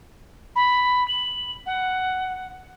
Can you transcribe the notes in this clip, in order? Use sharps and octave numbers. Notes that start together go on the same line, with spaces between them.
B5
F#7
F#5